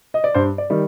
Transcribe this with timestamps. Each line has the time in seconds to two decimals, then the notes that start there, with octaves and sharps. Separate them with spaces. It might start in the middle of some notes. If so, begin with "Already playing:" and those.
0.14 D#5
0.24 D5
0.34 G2 C5
0.58 D5
0.70 D#3 G3